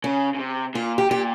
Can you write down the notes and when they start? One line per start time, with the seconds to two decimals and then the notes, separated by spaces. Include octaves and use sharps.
0.04 C#3 C#4
0.35 C#3
0.39 C3
0.74 A#2 F4
0.98 G4
1.10 A#2 G4